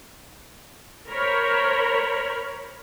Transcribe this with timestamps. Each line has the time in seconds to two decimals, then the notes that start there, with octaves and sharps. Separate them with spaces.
1.08 A#4 C5 C#5 B5